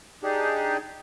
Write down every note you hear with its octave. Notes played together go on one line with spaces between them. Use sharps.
D4 D#4 G4 G#4